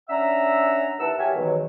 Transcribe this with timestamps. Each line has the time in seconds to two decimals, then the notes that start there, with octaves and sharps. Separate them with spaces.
0.09 C#4 D4 E5 F#5 A#5 E6
0.99 D#2 E3 F#5 A5 E6
1.18 F#4 G4 A#4 C#5 E5 G#5
1.34 G#2 B2 D#3 E3 F#3